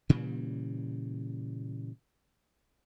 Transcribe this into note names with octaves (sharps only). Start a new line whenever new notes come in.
A#2 C#3 E3 G3